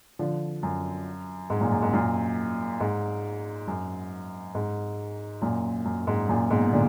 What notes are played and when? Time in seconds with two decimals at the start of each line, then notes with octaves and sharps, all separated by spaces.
0.19 D3 F3
0.63 F#2
1.50 G#2
1.61 F#2 A#2
1.72 F#2
1.82 G#2
1.93 F#2 A#2
2.80 G#2
3.68 F#2
4.55 G#2
5.41 F#2 A#2
5.85 F#2
6.07 G#2
6.29 F#2 A#2
6.50 G#2 B2
6.72 A#2 D3